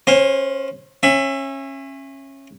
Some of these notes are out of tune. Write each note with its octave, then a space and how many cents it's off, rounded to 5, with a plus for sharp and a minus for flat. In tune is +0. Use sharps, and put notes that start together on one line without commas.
C#4 -25 C5 +0 F5 +0
C#4 -25 E5 +20